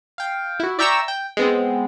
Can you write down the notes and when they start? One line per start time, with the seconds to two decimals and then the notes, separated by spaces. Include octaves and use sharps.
0.18 F5 G5
0.60 E4 F#4
0.79 D5 E5 G5 A#5 C#6 E6
1.08 G5
1.37 G#3 B3 C4